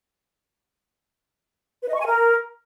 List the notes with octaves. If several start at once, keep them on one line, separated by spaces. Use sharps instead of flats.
B4
D#5
C#6
G#5
A#4